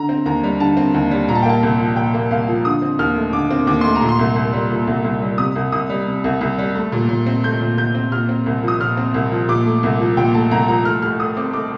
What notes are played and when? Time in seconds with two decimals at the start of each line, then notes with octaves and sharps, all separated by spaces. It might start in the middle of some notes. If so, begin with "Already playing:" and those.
Already playing: D3 A#5
0.09 C4
0.26 D#2 A#5
0.43 G3
0.60 D3 A5
0.77 C4
0.94 D#2
1.11 G3
1.28 A#2 A#5
1.35 A5
1.42 G5
1.46 A#3 A5
1.63 C2
1.80 F3
1.96 A#2 G5
2.14 A#3
2.31 C2 F5
2.48 F3
2.65 D3 D#6
2.82 C4
2.99 D#2 F6
3.16 A3
3.33 D3 D6
3.51 C4
3.67 D#2 D6
3.81 A3 C6
3.95 A#5
4.02 A#2
4.09 C6
4.19 C2
4.36 C2
4.53 G3
4.70 A#2
4.87 C2
5.04 C2
5.22 G3
5.38 C3 D#6
5.56 C2
5.72 C2 D#6
5.89 G3
6.07 C3
6.24 C2
6.41 C2
6.58 G3
6.75 A3
6.92 A#2
7.09 A#2
7.26 C4
7.43 A3 G6
7.60 A#2
7.77 A#2 G6
7.95 C4
8.12 A#2 F6
8.29 C4
8.46 C2
8.63 F3 D#6
8.80 A#2 F6
8.97 C4
9.14 C2
9.32 F3
9.49 A#2 D6
9.66 A3
9.83 C2
10.00 F3
10.17 A#2 G5
10.34 A3 A5
10.51 C2 A#5
10.68 F3 A#5
10.85 A3 F6
11.02 A2 F6
11.20 A2 D#6
11.37 C4 D6
11.54 A3 D6